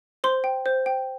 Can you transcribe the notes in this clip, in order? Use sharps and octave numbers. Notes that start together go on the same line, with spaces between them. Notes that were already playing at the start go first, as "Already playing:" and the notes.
C5 C6
G5
C5
G5